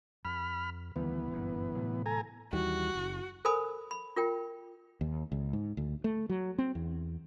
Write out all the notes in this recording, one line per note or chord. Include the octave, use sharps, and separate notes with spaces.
F2 B5 F6
D2 D#3 E3 G3 B3
G1 F#2 A#2
A2 C3 F#3
A4 G#5 A#5
D#2 E3 G3 F#4
F#1
A4 A#4 C5 G#5 B5 D#6
B5
F4 A#4 G5
D#2
C#2
G#2
D2
A3
F#3
C4
E2